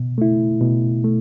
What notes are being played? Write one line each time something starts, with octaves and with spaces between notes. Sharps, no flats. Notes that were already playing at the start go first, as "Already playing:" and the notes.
Already playing: B2
A3 E4
B2
A3